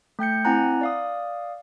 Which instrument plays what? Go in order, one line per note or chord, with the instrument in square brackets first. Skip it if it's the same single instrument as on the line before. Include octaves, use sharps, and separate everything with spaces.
[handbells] A3 G5 G6 C#7
C4 E4 F#5 G#5 A#5 F#6
D5 F5 D#6